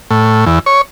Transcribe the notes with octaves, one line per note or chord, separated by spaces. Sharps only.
A2
E2
C#5